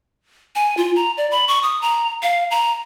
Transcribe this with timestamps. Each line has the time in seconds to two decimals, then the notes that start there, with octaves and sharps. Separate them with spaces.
0.55 G#5
0.77 F4
0.96 A#5
1.17 D5
1.31 B5
1.48 C#6
1.63 D#6
1.82 A#5
2.23 F5
2.51 A#5